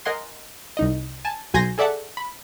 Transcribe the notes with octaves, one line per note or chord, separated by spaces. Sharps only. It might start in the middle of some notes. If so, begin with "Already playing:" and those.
A#4 D#5 F#5 G#5 C6
C2 D#4 D#5
G#5 A5
B1 F#4 G#5 C6 G6 A#6
G#4 A4 D5 E5 F#5 A5
B5